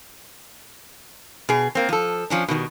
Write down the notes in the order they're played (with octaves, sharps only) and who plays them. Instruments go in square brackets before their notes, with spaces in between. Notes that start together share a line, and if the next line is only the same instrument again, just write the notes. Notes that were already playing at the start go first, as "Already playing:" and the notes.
[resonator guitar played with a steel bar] B2 G#4
A#3 C4
F3 A4
F3 C#4 D4
B2 D#3 F#3 G3